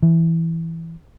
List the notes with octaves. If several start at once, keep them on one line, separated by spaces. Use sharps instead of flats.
E3